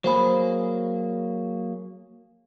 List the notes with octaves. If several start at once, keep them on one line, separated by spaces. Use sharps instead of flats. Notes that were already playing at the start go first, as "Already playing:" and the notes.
F#3 A#3 G#4 C5 B5